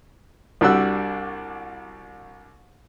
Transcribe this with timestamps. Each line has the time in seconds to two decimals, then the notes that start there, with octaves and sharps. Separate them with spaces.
0.61 C2 G3 D4 F#4 E6 F#6